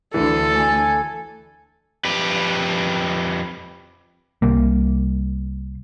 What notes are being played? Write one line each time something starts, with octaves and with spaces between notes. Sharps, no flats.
D2 E3 A4
G#5
F2 G4 B4
C2 G3 A#3